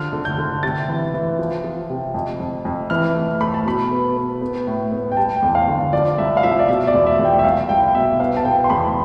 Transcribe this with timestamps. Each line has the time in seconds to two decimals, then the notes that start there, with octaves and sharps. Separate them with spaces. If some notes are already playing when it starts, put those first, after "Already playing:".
Already playing: D3 F3 F6
0.13 D3
0.25 G6
0.38 D3
0.63 C3 A6
0.88 E3
1.14 E3
1.39 F3
1.64 F3
1.90 C3
2.14 F2
2.40 F2
2.65 F2
2.90 E3 F6
3.15 A3
3.40 A3 B5
3.54 A5
3.66 B2 B5
3.91 B3
4.16 B3
4.41 B3
4.67 A2
4.91 B3
5.12 G5
5.17 G3 A5
5.36 G5
5.42 E2
5.55 F5
5.68 D3
5.93 F3 D5
6.18 C2 E5
6.37 F5
6.43 F3 E5
6.59 D5
6.68 B2 E5
6.87 D5
6.94 E2
7.07 E5
7.19 E2
7.25 G5
7.39 E5
7.44 C2 F5
7.69 C2 G5
7.95 B2 E5
8.20 B3 F5
8.37 A5
8.45 B3 G5
8.64 C6
8.70 E2 B5